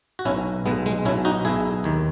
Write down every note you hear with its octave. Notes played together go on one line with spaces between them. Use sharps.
F#4
B1 B2 C#4 E4
B1 B2 G#3 B3
G#3
B1 B2 C#4 E4
D#4 F#4
B1 B2 E4 G#4
D#2 D#3